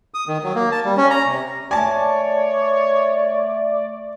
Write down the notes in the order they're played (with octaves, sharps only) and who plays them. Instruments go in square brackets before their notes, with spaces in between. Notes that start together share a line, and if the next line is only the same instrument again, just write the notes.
[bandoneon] D#6
D#3
F#3
A#3
A5
G3
C#4
A#5
C3
[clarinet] A3 [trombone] C#5 [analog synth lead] D5 [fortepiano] G#5 A5